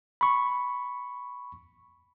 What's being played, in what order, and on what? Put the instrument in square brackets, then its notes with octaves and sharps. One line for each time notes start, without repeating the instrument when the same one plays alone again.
[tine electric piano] B5 C#6